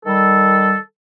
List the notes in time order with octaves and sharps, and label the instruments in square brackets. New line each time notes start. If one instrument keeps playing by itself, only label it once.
[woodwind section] D#3 G3 A4